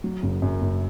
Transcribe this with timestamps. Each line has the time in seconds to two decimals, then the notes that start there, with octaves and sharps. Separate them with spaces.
0.04 F#3
0.23 F#1
0.42 F#2
0.61 F#1